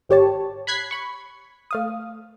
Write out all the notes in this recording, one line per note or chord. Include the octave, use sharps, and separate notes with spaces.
G#1 G4 C#5 A5
B5 F#6 G#6 B6 C7
B5 C#6
A3 F5 D#6